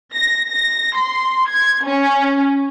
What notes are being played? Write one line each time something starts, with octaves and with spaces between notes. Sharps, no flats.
A#6
A#6
C6
G#6
C#4